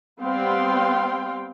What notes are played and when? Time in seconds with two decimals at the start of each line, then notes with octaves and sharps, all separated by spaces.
0.20 G3 B3 C4 F5 G5 C6